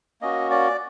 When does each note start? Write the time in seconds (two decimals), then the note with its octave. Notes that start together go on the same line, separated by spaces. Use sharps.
0.21 A#3 C#4 F#4 D#5
0.51 D5